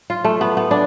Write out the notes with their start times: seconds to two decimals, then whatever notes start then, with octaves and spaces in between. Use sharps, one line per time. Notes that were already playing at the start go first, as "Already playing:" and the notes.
0.10 F4
0.24 A3
0.41 B3
0.57 B3
0.71 D4